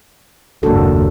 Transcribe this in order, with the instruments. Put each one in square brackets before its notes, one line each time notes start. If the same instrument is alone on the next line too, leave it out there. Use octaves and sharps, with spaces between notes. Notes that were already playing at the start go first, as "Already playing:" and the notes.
[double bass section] F#1 D#2 G#2 [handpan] D4 F#4 A4